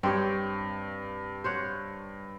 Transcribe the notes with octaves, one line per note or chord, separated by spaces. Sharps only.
G2 C4 G4 C#5
C5 C#5 F#5